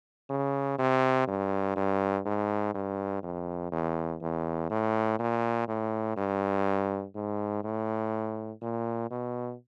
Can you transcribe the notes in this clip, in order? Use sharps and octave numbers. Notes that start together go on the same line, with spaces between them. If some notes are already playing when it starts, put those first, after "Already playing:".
C#3
C3
G2
G2
G#2
G2
F2
E2
E2
A2
A#2
A2
G2
G#2
A2
A#2
B2